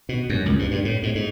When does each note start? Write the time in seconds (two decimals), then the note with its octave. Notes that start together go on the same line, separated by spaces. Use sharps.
0.09 B2
0.30 F#2
0.46 C#2
0.59 G2
0.71 G2
0.85 A2
1.03 G#2
1.15 G#2